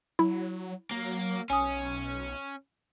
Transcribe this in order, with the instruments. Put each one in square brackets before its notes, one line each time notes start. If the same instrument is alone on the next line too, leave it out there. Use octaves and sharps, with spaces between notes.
[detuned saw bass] F#3 [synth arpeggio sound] E4
[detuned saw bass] F#3 [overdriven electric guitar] A#3
[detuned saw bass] B1 [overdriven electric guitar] C#4 [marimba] G#5 D#6